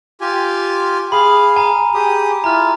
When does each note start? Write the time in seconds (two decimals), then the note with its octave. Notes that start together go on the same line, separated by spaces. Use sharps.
0.21 F4 G4 G#5
1.12 G#4 F5 B5
1.56 G#5 A#5
1.94 G4 G#4 D#6
2.44 E4 F4 A#5 F6